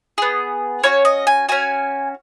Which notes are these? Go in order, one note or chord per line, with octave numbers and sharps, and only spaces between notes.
B3 G#4
C#4 F#4 C#5
D#5
G#5
C#4 F#4 G#5